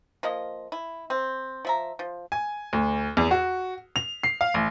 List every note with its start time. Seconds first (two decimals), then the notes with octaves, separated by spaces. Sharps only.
0.23 F3 A#3 D#5
0.72 E4
1.10 C4
1.65 F3 E5 A#5
1.99 F3
2.32 G#5
2.73 D2
3.17 E2
3.31 F#4
3.96 F7
4.23 C7
4.41 F5
4.54 A1